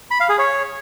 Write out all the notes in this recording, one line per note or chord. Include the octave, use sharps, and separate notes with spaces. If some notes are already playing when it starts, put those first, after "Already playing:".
B5
F5
G#4
C#5